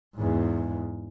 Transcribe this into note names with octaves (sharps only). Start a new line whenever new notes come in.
E2 G#2